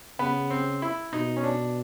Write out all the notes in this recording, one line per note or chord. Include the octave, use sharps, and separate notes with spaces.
C#3 B3
C4
E4
B2 D#4
C#4
D4